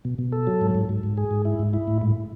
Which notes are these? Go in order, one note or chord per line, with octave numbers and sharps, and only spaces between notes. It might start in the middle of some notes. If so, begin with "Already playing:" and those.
B2
B2
A4
F#3
G#2
G#2
G#2
G#2
G#4
G#2
E4
G#2
E4
A2
G#2